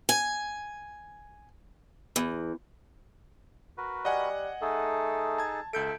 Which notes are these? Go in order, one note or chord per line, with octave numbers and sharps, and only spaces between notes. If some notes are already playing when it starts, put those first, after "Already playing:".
G#5
E2
F#4 A#4 B4
G3 D#5 F#5 G#5
A3 D#4 G#4 A4
A5 G#6
C#2 A4 E5 G6 D7